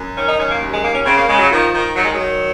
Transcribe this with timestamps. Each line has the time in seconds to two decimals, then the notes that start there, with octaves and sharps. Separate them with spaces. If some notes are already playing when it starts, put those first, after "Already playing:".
Already playing: F#2
0.15 D#3 C#4
0.26 D#4
0.38 F#2 C#4
0.49 A#3
0.59 D#2
0.71 G#3
0.82 D#2 A#3
0.93 C#4
1.04 C#3 C4
1.16 A#3
1.27 C#3 G#3
1.39 F#3
1.50 D#3 F3
1.72 D#3
1.94 D#3 F#3
2.03 G#3
2.12 F#3
2.17 D#3